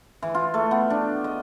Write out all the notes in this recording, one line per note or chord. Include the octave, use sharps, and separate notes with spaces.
E3
F4
A3
B3
D4
D#5